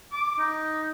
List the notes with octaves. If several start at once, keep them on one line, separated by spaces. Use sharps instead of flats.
D6
D#4